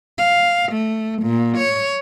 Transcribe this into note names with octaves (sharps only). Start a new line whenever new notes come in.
F5
A3
A#2
C#5